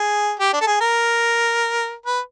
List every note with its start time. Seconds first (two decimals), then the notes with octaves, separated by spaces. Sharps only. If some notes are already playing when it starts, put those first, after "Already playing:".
Already playing: G#4
0.39 G4
0.53 D4
0.61 A4
0.67 G#4
0.81 A#4
2.06 B4